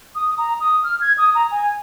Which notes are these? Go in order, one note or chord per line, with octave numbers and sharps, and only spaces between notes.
D#6
A#5
D#6
F6
G#6
D#6
A#5
G#5